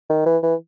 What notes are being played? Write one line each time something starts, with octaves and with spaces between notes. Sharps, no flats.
D#3
E3
E3